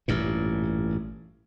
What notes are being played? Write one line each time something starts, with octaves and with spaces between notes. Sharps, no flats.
A1 G2 A#2